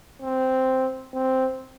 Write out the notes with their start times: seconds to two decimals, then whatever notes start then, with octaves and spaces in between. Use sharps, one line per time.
0.22 C4
1.13 C4